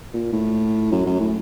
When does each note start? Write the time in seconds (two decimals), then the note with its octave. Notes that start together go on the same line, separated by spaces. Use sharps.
0.14 A#2
0.33 A2
0.91 F#2
1.06 F#2
1.20 A2